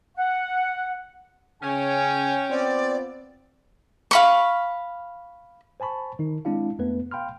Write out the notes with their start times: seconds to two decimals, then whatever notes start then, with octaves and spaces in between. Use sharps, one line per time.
0.16 F#5
1.63 C#3 C#4 C#5 G5 G#5
2.50 B3 C4 F4 D5
4.11 F5 B5 C#6
5.80 C5 G#5 A5 B5 C#6
6.19 D#3 D#4
6.45 G#3 C4 D4 E4 F5
6.79 F2 A3 B3 B4
7.11 F5 G5 B5 C6 F6